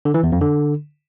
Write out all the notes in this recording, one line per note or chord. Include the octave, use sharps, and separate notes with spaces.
D3
E3
E2
F2
D3